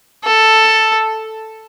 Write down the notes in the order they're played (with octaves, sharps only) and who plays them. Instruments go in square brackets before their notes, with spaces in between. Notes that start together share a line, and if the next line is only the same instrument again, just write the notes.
[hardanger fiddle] A4